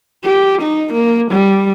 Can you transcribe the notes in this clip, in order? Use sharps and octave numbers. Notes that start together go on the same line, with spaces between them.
G4
D#4
A#3
G3